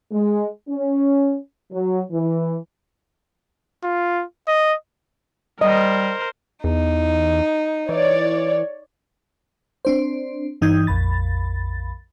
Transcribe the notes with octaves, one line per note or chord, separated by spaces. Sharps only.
G#3
C#4
F#3
E3
F4
D#5
G3 A#4 C5 D#5
E2 D#4
E3 C#5 D5
C4 D4 C5
G2 E3 D#4 D#6 G6 G#6
A#1 F2 B5 A6